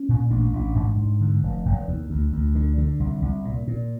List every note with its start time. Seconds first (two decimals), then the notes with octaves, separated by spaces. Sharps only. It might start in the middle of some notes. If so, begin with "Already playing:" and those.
Already playing: C#4
0.09 A#2
0.30 A1 D4
0.53 A1
0.75 G#2
0.98 G#2
1.21 D3
1.43 F1
1.65 F1
1.88 D#2
2.10 D2
2.32 D2
2.55 D3
2.78 D3
3.00 C2
3.22 C2
3.45 A#2
3.67 A#2